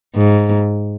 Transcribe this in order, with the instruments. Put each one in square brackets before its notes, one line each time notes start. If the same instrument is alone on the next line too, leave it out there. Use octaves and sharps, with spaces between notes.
[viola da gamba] G#2